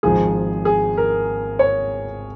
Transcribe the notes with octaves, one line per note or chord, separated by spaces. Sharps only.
G#1 G#2 F3 G#4
G#4
A#4
C#5